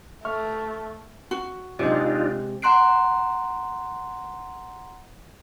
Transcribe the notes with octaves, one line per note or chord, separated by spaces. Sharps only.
A3 E5 C#6 F6
F#4
C3 G#3 D4 D#4 F4
F#5 A#5 C6 F#6 C7 D7